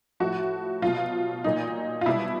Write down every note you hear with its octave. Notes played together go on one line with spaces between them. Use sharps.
A2 F3 F#4
B2 F#3 F4
A#2 F#3 D#4
F4
B2 G3 E4